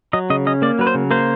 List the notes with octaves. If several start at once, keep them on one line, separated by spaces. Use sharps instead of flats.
F#3 D#5
C#3 D#5
C#4 D#5
A#3 D5
F#3 B4
C5
C#3
A#3 C5